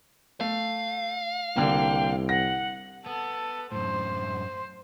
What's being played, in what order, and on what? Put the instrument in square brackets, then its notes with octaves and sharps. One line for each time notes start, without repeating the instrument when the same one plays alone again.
[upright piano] A3 [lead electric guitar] F5
[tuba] C2 [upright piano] D3 A#3 [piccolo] G5
[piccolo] F#5 [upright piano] A#6
[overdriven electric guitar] B3 [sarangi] A4
[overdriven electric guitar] F#2 A2 [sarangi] C5